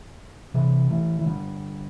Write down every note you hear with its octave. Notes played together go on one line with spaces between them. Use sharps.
C3 E3
E3 A3
E3
D3 G3